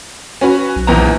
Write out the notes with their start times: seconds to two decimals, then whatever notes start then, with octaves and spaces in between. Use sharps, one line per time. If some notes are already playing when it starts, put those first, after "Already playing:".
0.41 C#4 F#4 B4
0.76 B1
0.87 A#1 E2 A#5